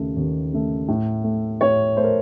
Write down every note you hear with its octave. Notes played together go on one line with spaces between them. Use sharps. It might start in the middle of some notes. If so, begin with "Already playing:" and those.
Already playing: D#2 C#3 A3
D#2
C#3 A3
A2
A3
A2 C#5
A3 C5
A#4